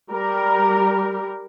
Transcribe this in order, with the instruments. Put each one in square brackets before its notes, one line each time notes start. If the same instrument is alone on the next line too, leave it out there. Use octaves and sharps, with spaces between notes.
[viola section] G3 A#4